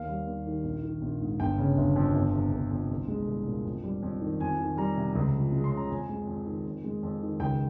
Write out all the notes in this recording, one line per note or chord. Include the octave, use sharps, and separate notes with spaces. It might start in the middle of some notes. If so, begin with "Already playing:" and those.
Already playing: D#2 F5
G3
D#2
D#3
A#1
D#3
A#1
G#2
G1 G5
C#3
G1
F2
G1
C3
G1
F2
C2
G#3
C2
A#2
F2
G3
F2
D#3
F2 G#5
D#3
G3 A#5
C3
C#2
F3
G#3
C6
C#3
A#5
F2 G#5
G#3
F2
D#3
F2
G#3
F2
D#3
C#2 G5